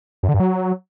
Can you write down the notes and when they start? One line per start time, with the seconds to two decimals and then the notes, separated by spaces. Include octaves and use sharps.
0.23 F#2
0.29 D3
0.34 G2
0.40 F#3